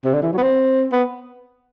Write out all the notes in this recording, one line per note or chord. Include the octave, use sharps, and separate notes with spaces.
C3
D3
E3
F#3
B3
C4
B3